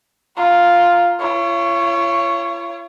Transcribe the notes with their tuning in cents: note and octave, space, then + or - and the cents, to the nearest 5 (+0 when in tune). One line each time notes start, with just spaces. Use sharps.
F4 +0 A#5 +0
F4 -45 C#5 +0